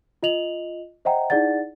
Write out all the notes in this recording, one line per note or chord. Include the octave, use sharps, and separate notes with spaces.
F4 D#5 F7 F#7
C5 D#5 E5 F#5 G5 A#5
D#4 E4 G#4 D5 F#5 A6